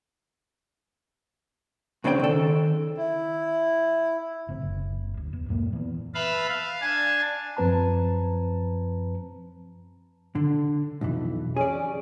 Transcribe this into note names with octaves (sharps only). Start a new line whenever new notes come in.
B1 C#3 C4 D4 G5
D#3 A4
E4
A1 C#3 C4
F#1
D2
E2
F#2 A#2 A#3
E3 B3
B4 E5 F5 A5 B5
F5
D4 G#5 A5
F#2 F3 C4 B4 A5 A#5
D3
B1 F2 E3
C#4 G#4 D5